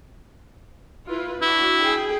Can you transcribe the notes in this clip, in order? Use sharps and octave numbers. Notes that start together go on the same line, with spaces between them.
E4 F4 B4
D4 E4 F#4
G#4 G5